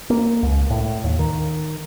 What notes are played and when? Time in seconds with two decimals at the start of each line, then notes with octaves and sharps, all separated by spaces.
0.10 A#3
0.43 C#2
0.70 A2
1.04 D#2
1.19 D#3